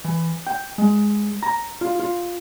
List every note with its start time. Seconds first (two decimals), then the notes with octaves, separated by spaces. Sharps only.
0.04 E3
0.47 G5
0.78 G#3
1.43 A#5
1.81 F4
2.00 F4